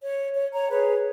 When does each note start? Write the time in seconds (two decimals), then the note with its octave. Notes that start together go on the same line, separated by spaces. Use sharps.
0.02 C#5
0.34 C#5
0.53 C#5 A#5
0.70 G#4 B4 C#5